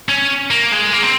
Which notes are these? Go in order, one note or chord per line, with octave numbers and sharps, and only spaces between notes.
C#4
A#3
G#3
A#3
C4